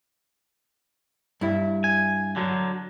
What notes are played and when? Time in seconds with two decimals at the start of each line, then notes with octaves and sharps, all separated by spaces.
1.41 G2 E4
1.84 G#5
2.36 D3 F#3